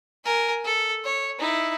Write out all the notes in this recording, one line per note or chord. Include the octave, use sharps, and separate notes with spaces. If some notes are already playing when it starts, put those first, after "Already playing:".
A#4 G#5
A4
C#5
D#4 E4